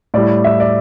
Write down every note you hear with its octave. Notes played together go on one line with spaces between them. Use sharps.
A2 G3 D5
E5
D5